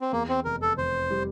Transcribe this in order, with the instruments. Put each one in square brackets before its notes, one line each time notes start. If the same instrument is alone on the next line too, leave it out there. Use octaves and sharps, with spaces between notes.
[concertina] C4
[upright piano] E2 [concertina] A#3
[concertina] C4
[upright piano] F1 [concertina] A#4
[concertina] A4
[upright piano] F1 [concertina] C5
[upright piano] G3